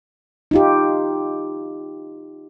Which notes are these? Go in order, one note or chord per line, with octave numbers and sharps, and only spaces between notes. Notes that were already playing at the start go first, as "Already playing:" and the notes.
D#4 F4 G4